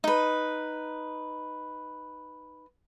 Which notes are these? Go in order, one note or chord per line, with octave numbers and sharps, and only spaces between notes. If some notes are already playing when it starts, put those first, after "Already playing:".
D#4 B4